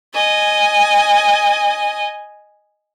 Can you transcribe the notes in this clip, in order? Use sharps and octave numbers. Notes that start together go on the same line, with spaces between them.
D#5 G#5